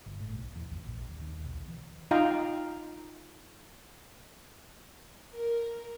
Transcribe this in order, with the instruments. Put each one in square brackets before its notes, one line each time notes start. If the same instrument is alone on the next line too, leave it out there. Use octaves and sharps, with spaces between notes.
[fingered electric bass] G1
A2
B1
E2
G#1
A#1
D#1
D#2
B1
E3
[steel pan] D#4 F4 D#5 F5 G5 A#5
[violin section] A#4